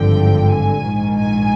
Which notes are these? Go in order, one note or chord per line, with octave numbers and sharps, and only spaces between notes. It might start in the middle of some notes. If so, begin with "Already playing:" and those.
Already playing: G#1 G2 D3 F3 G5
G#5
A#1 G#2 D#3
G#5